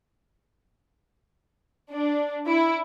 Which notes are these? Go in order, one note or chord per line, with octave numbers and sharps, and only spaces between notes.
D4
E4